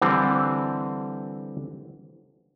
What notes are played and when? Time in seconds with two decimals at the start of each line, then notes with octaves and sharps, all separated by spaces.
0.02 D3 E3 G3 C4